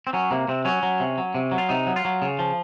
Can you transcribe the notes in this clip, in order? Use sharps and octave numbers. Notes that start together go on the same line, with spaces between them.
C4
F#3 C#4
C3 A#3
C3 C4
F#3 C#4
F#3
C3
F#3
C3
F#3
F4
C3 D#4
F#3
F4
F#3
C#3
F3